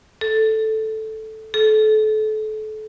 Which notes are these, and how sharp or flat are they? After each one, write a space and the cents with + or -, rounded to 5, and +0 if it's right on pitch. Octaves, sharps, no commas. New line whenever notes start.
A4 -5
A4 -30